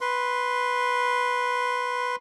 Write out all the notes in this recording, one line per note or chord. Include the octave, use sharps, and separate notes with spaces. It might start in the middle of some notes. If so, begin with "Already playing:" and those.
B4 C6